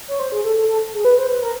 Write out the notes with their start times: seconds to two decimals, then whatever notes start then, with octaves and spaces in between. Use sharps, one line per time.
0.08 C#5
0.19 C5
0.32 G#4
0.44 A4
0.56 A4
0.69 A4
0.93 G#4
1.05 B4
1.18 C5
1.30 B4
1.42 A#4